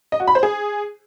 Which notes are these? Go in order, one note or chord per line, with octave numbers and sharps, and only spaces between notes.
D#5
F#4
B5
C5
G#4